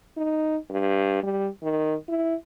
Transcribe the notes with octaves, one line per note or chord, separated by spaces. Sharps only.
D#4
G2
G3
D#3
E4